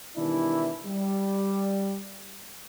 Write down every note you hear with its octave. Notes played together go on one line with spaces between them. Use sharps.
B2 D#3 E3 G3 D4 E4
G3